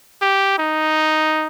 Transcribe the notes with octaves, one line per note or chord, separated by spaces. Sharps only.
G4
D#4